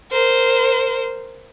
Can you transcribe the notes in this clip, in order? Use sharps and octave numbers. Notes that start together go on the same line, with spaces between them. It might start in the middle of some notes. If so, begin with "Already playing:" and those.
A#4 C5